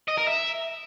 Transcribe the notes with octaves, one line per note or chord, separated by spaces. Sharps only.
D#5
A#4
E5